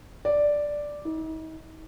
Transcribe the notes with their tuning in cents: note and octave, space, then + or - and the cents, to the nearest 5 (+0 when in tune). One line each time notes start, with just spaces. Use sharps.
D5 +0
D#4 +40